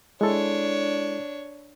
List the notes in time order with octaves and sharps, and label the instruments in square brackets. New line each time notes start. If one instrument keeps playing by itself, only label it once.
[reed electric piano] G#3 E4 A4 [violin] D4 C#5